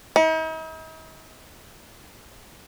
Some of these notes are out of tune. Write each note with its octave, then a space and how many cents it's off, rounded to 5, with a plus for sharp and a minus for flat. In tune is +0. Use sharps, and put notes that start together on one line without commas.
D#4 +45